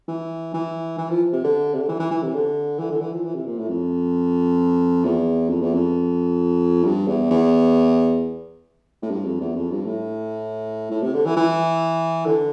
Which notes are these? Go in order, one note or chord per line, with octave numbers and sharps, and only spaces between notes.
E3
E3
E3
F3
C3
D3
C3
D3
E3
E3
E3
C3
D3
E3
D3
E3
F3
E3
C3
A#2
A2
F2
E2
F2
E2
F2
G2
E2
E2
A2
G2
F2
E2
F2
G2
A2
A2
C3
D3
E3
E3
D3